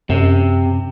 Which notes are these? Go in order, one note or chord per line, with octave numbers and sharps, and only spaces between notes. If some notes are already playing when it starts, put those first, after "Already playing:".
F#2 C3